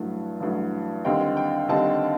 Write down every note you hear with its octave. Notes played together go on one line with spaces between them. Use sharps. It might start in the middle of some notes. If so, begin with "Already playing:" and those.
Already playing: A1 G2 F#3 A3
A1 G2 F#3 A3
D#2 D3 G3 C4 D#4 G5
G5
D#2 D3 G3 C4 D#4 A5